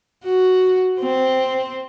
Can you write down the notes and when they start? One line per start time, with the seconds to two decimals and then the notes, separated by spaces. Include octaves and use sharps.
0.24 F#4
1.00 C4